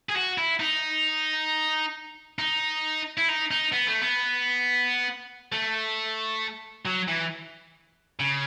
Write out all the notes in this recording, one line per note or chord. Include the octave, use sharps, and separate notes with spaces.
G#4
F#4
E4
D#4
D#4
E4
D#4
D#4
B3
A3
B3
A3
F#3
E3
C#3